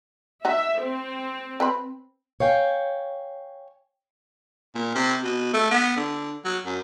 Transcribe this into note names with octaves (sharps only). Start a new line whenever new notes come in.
D#4 F#4 E5
C4
C4 B4 B5
C#5 F5 G5 G#5
A#2
C3
B2
A3
B3
D3
F#3
F#2